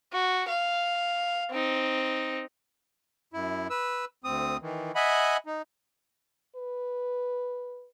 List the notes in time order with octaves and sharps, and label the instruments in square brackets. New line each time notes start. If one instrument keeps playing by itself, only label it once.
[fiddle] F#4
F5
C4 D#4
[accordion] F#2 E4
B4 E6
D2 C4 D#6
D#3 E3
D#5 E5 F#5 G#5 B5
D#4
[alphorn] B4